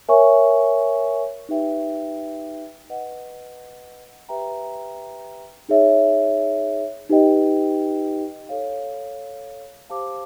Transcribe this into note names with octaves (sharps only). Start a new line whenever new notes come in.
A#4 C#5 E5 G#5 C#6
D#4 G4 B4 E5 G5
B4 D#5 F#5
G4 B4 E5 G5 A#5
D#4 G#4 C#5 E5
D#4 G4 B4 D#5 G5
A4 C#5 F5
G4 C5 F5 A5 D6